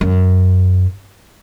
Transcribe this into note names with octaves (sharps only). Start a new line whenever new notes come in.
F#2